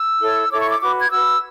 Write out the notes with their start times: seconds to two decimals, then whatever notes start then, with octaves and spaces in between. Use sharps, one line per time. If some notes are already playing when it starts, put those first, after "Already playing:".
Already playing: E6
0.20 E4 A4 C#5
0.50 E4 A4 C#5 D6
0.61 C#6
0.71 D6
0.81 F#4 B4 D6
1.01 G#6
1.11 F#4 B4 E6